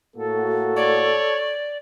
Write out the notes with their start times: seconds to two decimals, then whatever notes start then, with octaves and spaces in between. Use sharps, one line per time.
0.16 A2 A#3 F#4 A4
0.76 C#5 D5